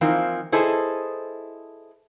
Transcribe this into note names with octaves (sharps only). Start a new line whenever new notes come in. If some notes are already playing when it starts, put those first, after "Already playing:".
E3 F3 A#3 C4 D#4
E4 G#4 A4 B4 C5 D#5